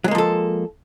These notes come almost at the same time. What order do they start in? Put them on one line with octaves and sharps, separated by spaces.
F#3 G#3 A#3 F3 A4